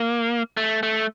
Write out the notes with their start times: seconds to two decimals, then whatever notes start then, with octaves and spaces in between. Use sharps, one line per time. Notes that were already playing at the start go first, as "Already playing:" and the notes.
Already playing: A#3
0.57 A3
0.83 A3